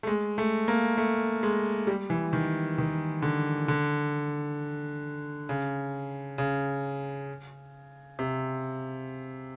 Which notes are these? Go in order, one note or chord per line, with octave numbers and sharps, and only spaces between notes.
A3
G#3
A3
A#3
A3
G#3
G3
E3
D#3
D#3
D3
D3
C#3
C#3
C3